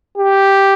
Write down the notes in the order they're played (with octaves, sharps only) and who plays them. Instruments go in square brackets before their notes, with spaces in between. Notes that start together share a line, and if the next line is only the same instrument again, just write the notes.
[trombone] G4